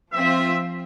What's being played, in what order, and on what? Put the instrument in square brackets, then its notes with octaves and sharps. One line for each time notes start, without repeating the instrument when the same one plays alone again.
[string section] F3 C4 F4 [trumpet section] E5